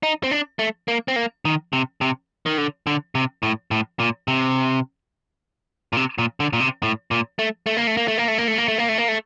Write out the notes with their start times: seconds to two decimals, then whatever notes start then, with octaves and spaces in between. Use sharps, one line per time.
0.03 D#4
0.24 C4
0.31 D4
0.59 A3
0.88 A#3
1.08 C4
1.16 A#3
1.45 D#3
1.73 C3
2.01 C3
2.46 D#3
2.58 D3
2.87 D3
3.15 C3
3.43 A2
3.71 A2
4.00 A#2
4.28 C3
5.93 A#2
5.97 C3
6.18 A#2
6.40 D3
6.53 A#2
6.60 C3
6.83 A2
7.11 A#2
7.39 A3
7.66 A3
7.77 A#3
7.87 A3
7.97 A#3
8.08 A3
8.18 A#3
8.28 A3
8.38 A#3
8.48 A3
8.58 A#3
8.68 A3
8.78 A#3
8.89 A3
8.98 A#3
9.08 A3